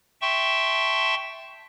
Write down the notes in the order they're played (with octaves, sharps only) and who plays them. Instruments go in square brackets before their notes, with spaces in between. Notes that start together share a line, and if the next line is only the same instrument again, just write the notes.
[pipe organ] E5 G5 A5 C6 C#6